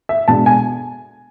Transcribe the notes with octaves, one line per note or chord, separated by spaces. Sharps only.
E5
B2 G#3 B3 D4 A5
G#5